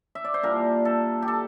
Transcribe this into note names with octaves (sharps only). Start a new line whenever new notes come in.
E5
D5
C5
A#2 G3 A#3 D4 A#4
A4
G4
A4